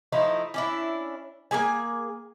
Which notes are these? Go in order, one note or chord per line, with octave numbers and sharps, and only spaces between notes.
F3 A3 D#4 E4
C#4 D4 E4
A#3 B3 G#4 G#5